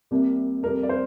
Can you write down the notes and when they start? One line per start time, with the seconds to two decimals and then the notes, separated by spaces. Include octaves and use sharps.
0.11 C2 C3 G3 A#3
0.63 F2 C3 G3 A#4
0.83 D5
0.89 C5